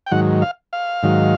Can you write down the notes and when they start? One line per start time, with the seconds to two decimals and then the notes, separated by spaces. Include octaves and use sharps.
0.06 G5
0.11 G#2 D#3 F#3 F#5
0.42 F5
0.73 F5
1.03 G#2 D#3 F#3